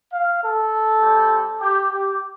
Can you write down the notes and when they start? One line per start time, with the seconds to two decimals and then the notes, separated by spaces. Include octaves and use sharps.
0.12 F5
0.42 A4
1.02 G3 C4 G4
1.60 G4
1.91 G4